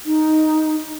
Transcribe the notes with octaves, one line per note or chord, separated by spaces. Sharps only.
D#4